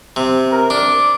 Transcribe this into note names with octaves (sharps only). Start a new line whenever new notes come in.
C3
A#4
D4 D6